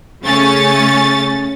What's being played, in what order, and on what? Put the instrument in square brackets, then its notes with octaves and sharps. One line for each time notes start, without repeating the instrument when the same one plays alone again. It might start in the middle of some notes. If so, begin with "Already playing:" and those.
[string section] C#3 A3 C#4 A6